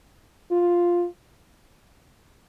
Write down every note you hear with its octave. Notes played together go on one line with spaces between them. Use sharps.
F4